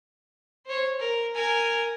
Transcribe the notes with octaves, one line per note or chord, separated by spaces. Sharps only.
C5 C#5
A#4
A#4 G#5